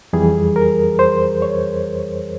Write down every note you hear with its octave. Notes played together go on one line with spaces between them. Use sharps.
F2 E3 G3 G#4
A#4
C5
C#5